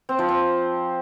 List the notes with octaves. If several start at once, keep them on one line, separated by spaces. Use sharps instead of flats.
C4
F3
C4